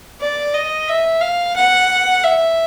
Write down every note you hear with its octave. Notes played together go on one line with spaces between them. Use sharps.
D5
D#5
E5
F5
F#5
E5